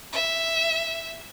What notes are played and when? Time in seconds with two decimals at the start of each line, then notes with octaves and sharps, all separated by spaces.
0.13 E5